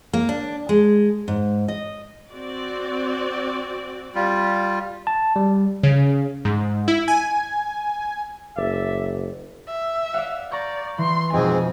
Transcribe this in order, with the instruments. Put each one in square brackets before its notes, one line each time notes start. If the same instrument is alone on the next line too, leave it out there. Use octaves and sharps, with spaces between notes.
[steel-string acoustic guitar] A#3
D4
G#3
G#2
D#5
[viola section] C4 F#4 D5
[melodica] G3 F4
[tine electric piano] A5
G3
[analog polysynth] C#3
G#2
E4
G#5
[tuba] F#1 [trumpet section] D5 E5
[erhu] E5
[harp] D5 F5 F#5
[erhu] D5 [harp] A#5 C#6 G6
[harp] E3 [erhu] C6
[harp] F2 B2 [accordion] G#2 G#3 C4 [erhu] G#5